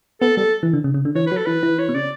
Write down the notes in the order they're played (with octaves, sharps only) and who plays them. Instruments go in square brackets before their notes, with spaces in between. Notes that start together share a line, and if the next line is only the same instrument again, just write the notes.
[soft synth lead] B3 [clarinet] A4
[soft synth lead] G3 [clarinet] A4
[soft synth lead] E3
D3
C#3
C#3
D3
[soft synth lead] E3 [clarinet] C#5
[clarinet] B4
[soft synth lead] F#3
[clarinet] A4
[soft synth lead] E3 [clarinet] B4
[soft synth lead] E3
[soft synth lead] E3 [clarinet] C#5
[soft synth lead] B2
[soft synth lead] C#3 [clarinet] D5